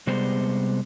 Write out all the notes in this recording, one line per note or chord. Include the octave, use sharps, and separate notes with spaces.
C3 G3 G#3 B3 C5